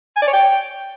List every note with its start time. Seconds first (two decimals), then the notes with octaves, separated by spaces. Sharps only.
0.16 G#5
0.22 D5
0.27 C#5
0.33 G5